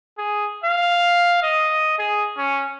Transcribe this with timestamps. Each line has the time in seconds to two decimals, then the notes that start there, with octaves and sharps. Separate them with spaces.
0.18 G#4
0.64 F5
1.42 D#5
1.98 G#4
2.38 C#4